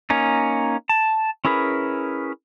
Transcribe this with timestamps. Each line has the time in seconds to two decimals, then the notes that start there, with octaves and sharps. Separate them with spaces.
0.10 A#3 C#4 D#4
0.89 A5
1.45 C#4 E4 G#4 A#4 B4